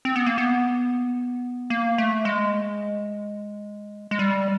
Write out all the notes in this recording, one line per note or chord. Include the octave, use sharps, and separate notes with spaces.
C4
B3
A#3
B3
A#3
A3
G#3
G#3
G3